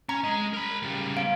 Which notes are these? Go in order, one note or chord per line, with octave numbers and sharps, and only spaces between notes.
C#4 A#5
G#3 D#5
A#4 B5
C#3 G3
B3 F5 D7